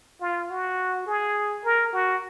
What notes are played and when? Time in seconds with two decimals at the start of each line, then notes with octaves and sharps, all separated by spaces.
0.21 F4
0.50 F#4
1.06 G#4
1.65 A#4
1.93 F#4